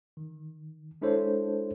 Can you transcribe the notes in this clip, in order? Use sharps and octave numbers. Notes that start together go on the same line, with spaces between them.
D#3
G#3 D4 E4 A4 C5 C#5